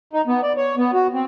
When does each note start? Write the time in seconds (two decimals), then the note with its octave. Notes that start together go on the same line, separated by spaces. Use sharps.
0.13 D#4
0.27 B3
0.43 D5
0.57 C#5
0.77 B3
0.93 F#4
1.14 C4